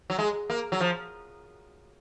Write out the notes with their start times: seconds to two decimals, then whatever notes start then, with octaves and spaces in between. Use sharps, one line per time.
0.10 F#3
0.19 G#3
0.50 A#3
0.72 F#3
0.81 F3